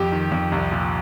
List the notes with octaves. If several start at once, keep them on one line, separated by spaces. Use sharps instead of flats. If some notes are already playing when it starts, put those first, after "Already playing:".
Already playing: F2 G4
D#3
F2
C2
A#2